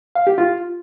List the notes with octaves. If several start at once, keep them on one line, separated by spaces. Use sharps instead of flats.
F5
G4
F4